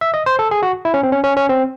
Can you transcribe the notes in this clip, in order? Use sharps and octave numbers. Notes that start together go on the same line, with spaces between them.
E5
D#5
C5
A4
G#4
F#4
E4
C#4
C4
C#4
C#4
C#4
C4